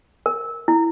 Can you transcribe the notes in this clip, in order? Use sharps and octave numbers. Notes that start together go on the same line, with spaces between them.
A#4
E4